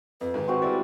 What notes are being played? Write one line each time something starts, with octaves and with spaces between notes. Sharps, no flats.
F2 B4
G#2 D#3
C4 F#4 C5
G3 G#3 E4 D5